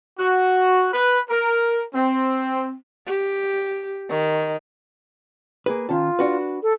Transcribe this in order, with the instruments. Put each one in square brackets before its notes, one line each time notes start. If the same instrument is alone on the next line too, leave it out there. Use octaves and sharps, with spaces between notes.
[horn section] F#4
B4
A#4
C4
[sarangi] G4
D#3
[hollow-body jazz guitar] A#3 G#4 B4
[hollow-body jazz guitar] D#3 C#4 A5 [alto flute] F4
[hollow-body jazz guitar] D4 F#4 B4
[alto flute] A4